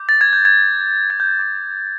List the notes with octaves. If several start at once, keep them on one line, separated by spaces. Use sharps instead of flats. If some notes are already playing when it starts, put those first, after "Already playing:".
Already playing: D6 G6
A6
G#6
G6
G#6
G#6
G6
D6 G6